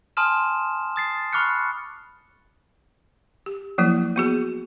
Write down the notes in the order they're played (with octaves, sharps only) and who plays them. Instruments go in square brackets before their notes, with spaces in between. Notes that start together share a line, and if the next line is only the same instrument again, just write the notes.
[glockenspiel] G#5 A5 C6 D#6 F6 E7
D#6 A6 C7
B5 C#6 D6 F6 F#6 C#7
[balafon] G4
F3 F#3 A#3 E4
B3 F#4 G#4